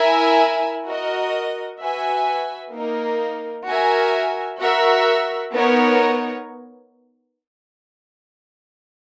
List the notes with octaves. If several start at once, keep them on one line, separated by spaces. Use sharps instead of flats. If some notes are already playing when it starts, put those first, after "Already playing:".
Already playing: E4 A#4 E5 G#5
F#4 A#4 D#5
F#4 B4 E5 G#5
A#3 D#4 A#4
F#4 A#4 E5 G#5
F#4 A#4 E5
B3 D#4 A#4 C#5